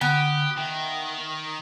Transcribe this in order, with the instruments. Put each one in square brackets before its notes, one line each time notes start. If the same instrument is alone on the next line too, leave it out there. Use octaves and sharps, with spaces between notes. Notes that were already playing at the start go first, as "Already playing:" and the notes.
[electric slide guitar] D3 [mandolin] B3 [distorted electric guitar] G4
[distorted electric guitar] D#3 [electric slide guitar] E5 G5